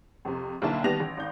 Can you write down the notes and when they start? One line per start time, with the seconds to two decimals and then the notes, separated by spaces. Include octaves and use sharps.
0.25 F2 C3
0.62 B1 D3 A#3 E4 A5
0.84 D#3 G3 B3 A5 A#6 F7
1.00 A1
1.17 G#1 G6